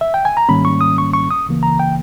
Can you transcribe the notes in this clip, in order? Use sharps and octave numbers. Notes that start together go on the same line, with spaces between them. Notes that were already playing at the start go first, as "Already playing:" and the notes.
E5
G5
G#5
A#5
G#2 D#3 G3 A#3 C#4 B5
C#6
D#6
C#6
C#6
D#6
C#2 C#3 E3 A#3
A#5
G5